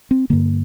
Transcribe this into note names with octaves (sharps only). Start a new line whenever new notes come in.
C4
G2 D3 A#3